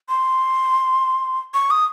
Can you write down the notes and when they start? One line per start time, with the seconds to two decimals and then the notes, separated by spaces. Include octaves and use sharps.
0.09 C6
1.54 C#6
1.71 D#6